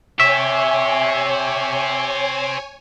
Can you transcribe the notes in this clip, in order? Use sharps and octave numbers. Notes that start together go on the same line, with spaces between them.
C4 G4 C#5 E5 G#5